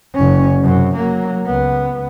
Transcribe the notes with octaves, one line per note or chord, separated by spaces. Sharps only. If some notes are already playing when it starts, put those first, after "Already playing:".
F#1 C#4
F#2 C3
F#3 A#3
C#2 B3